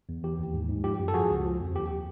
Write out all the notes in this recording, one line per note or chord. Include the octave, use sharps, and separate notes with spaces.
E2
E3 G4
D#2
G#2
G#2
F3 G4
F#2
A4
F3 F#4 G#4
C#2
F3
F2
D#2 G4